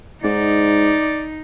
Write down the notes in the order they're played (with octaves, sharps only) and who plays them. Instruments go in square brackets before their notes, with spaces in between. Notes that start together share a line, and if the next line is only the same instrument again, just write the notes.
[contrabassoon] G#2 [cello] D#4 [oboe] D5